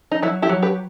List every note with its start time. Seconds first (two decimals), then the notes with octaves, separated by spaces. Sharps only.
0.12 D#4
0.22 F#3 E4
0.42 E4 G4
0.49 F#3
0.62 G4 B4